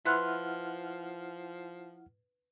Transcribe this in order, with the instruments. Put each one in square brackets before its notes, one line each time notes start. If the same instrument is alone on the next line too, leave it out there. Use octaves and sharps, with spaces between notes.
[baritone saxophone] F3 [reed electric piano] E4 F#5 F6 [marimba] B4 C6 F#6